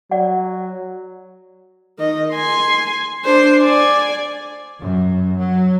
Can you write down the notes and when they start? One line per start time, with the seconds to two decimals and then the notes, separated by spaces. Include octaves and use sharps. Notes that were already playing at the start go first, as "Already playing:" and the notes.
0.11 F#3 D5 F#5
1.99 D#3 D#5
2.33 G#5 C6
3.24 D4 C5
3.61 D5 G#5
4.79 F#2
5.37 F#3